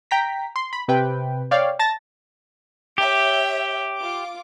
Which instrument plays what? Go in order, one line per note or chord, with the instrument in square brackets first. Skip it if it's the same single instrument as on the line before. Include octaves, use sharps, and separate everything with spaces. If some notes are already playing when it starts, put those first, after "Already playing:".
[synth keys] G5 A#5 B6
C6
B5
C3 B4 G5
C#5 D5 F5 G5
A5 A6 A#6
[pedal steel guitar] G4 [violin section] C#5 E5 G5
[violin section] F4 D6